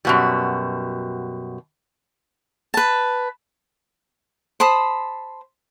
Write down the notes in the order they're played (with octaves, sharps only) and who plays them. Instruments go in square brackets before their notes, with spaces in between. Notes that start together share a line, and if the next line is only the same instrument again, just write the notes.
[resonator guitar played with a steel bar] F#2 B2 G3
[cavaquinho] B4 A5
C5 A5 B5 D#6